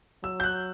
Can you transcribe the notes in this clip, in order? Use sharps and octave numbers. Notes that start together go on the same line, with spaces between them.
F#3 E6
G6
F#6